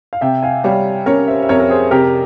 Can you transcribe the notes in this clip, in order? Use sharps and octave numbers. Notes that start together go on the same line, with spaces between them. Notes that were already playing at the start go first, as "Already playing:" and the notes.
F5
C3 E5 G5
F5 G#5
G3 C#5 F5
C#4 A#4 C#5
C5 E5
E5
F2 A#4 C#5
A#4
G#4 C5
C3 G4 A#4